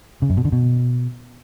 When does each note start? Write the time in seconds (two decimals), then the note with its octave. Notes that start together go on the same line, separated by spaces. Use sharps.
0.22 C#3
0.30 F#2
0.37 B2
0.45 D3
0.52 B2